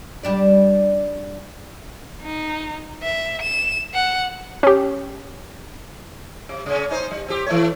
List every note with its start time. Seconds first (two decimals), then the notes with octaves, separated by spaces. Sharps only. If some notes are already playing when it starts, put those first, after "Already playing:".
0.23 G3 D4 D5
2.23 D#4
3.04 E5
3.42 E7
3.94 F#5
4.63 C#4 G4
6.49 C3
6.66 C#3 C#4
6.89 C#4 D#4 C5
7.11 G3
7.28 C4 G4
7.47 E3 A3 C#5